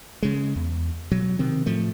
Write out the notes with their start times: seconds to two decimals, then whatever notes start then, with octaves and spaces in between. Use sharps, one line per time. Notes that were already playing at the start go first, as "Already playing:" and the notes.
0.23 C#3 G#3
0.56 E2
1.11 B2 F#3
1.39 C3 D#3 C4
1.66 A2 F3 A3